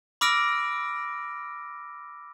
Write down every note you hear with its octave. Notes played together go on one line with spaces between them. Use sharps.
B5 D6 E6 F6 A#6 D7